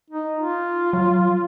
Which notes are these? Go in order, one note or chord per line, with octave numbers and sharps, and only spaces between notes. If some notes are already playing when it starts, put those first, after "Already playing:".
D#4
F4
F#3